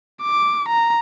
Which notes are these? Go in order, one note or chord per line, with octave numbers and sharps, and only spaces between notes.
D6
A#5